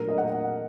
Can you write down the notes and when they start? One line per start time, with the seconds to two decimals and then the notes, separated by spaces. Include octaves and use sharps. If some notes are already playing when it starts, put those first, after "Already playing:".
Already playing: A#2 F#3 A3 D4 A#4
0.09 D#5
0.18 F#5